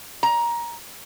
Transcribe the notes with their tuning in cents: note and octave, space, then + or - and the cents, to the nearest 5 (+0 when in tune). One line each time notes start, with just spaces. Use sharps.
A#5 +15